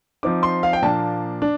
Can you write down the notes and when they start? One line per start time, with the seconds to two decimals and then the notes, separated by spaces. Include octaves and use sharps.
0.23 F3 C4 D#4 D6
0.43 C6
0.63 F5
0.73 G5
0.82 A#2 F3 A#3 D4 A5
1.42 D4